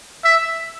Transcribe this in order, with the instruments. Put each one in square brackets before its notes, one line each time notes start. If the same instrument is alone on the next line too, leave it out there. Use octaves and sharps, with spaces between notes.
[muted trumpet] E5